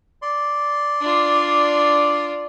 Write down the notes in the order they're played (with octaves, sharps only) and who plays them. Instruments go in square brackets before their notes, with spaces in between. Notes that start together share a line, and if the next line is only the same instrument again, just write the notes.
[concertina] D5 C6
[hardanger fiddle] D4 F4